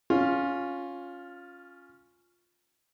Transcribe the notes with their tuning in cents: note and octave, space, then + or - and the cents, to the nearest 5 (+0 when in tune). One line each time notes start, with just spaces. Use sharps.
C#4 +0 F4 +10